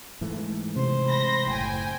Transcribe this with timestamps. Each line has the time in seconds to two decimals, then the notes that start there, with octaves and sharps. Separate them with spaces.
0.21 G#2 E3 A3
0.76 C3 C5
1.05 B5 A#6
1.46 F#1 A2 G5 G#5